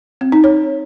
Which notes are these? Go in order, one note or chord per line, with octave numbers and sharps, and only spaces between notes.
C4
D#4
C#5